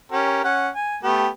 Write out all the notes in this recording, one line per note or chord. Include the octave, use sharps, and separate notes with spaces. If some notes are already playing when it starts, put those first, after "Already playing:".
C#4 G4 A#4
C#4 F#5
G#5
A3 B3 G4